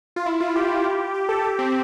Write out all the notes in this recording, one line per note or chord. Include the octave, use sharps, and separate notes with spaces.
F4
E4
F4
G4
G4
A4
G4
C4